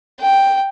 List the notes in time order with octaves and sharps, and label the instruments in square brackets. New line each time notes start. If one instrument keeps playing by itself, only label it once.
[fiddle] G5